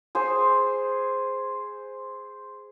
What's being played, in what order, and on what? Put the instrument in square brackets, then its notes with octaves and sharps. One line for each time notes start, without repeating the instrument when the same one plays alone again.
[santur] G#4 C5 G#5